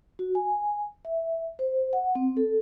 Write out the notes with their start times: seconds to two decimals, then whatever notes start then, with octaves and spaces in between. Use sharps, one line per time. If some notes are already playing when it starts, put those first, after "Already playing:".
0.19 F#4
0.35 G#5
1.05 E5
1.59 C5
1.93 F#5
2.15 C4
2.37 A4